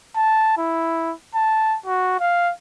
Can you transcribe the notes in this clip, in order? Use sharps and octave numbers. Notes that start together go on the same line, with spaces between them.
A5
E4
A5
F#4
F5